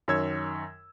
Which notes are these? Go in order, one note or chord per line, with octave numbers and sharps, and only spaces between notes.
F#2 D#3 C#5 E6 G#6